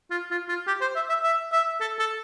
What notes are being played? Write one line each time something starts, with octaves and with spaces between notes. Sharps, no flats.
F4
F4
F4
G4
C5
E5
E5
E5
E5
A4
A4